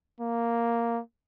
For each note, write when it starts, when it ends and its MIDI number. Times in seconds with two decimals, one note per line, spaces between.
0.21 1.01 58